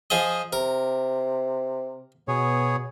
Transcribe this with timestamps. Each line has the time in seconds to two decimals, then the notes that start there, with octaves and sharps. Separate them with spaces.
0.10 F3 G#4 D#5
0.53 C3 A#4
2.28 B2 B3 G#4 C#5